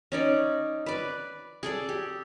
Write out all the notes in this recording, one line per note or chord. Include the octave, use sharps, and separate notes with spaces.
C#4 D#4 D5
B4 D5
G#4 A4 D5
G4